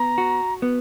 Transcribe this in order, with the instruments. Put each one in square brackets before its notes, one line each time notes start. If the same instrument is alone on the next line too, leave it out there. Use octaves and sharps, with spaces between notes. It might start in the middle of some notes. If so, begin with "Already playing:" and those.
Already playing: [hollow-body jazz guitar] B3 [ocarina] A#5
[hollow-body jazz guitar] F#4
B3